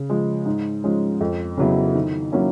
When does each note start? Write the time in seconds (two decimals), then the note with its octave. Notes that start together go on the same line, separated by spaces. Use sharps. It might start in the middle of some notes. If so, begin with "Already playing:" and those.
Already playing: C#3
0.10 F3 G#3
0.46 G#2
0.84 F3 G#3 C#4
1.21 F2
1.57 C#3 F#3 B3 E4
1.95 D#3
2.32 F#3 A#3 C#4 E4